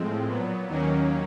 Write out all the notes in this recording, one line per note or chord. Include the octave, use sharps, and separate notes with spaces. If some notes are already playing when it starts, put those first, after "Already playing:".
Already playing: A2 F3 G#3 C4
A#2 F#3 B3
D#2 D#3 F#3 A#3 C#4